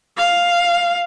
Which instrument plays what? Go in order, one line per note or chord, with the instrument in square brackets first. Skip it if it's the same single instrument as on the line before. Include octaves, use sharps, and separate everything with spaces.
[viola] F5